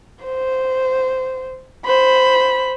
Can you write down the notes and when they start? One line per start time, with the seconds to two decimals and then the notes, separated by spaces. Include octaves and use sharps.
0.24 C5
1.85 C5 B5